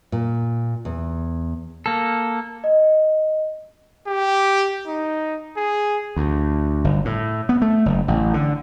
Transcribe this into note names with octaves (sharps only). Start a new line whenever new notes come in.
A#2
E2
A#3 A4
D#5
G4
D#4
G#4
D2
G1
A2
B3
A3
F#1
A1
D3